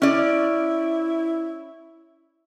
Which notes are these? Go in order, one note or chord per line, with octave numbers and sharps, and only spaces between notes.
C#4 E4 D5